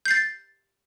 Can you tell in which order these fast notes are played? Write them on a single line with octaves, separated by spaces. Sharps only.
G6 C7 A6